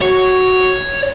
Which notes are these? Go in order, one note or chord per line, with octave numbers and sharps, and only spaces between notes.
F#4 C#5